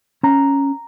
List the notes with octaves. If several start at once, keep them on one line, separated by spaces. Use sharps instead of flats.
C#4 A#5